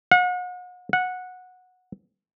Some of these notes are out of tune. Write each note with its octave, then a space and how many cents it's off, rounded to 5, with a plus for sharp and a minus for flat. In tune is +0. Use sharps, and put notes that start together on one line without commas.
F#5 -40
F#5 -15